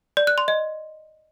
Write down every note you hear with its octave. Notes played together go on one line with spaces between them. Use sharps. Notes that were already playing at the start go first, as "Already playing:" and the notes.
D5
F#6
C6
D#5